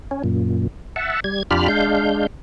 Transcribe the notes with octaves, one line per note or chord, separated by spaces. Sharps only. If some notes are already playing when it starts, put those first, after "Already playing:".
C#4
F#2 A#2
E5 F#5 A5
G3 G#6
F2 D4 F4 G4 B5 F6
G#3 D4 F5 G6